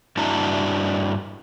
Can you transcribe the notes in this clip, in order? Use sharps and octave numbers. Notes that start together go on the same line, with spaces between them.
G2 D4 E4 F#4 A5 A#5